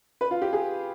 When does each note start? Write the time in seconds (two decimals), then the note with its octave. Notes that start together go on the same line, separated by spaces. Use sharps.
0.21 B4
0.31 F4
0.42 G4
0.53 G#4